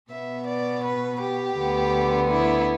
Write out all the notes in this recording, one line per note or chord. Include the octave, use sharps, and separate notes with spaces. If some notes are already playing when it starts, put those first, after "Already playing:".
B2 B3 E5
D5
B4
G4
D2 D3 B3
E4